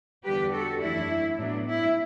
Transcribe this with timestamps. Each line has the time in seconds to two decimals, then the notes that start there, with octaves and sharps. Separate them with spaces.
0.25 E2 D3 G3 G4 B4
0.54 F#4 A4
0.81 F#2 E3 A3 D4 E4
1.38 A2 F#3 B3 D4
1.66 E4